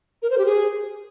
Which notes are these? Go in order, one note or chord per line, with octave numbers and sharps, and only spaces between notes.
A#4
C5
G4
G#4